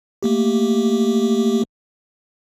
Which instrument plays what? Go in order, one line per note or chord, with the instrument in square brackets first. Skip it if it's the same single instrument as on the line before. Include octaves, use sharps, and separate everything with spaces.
[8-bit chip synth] A3 A#3 G4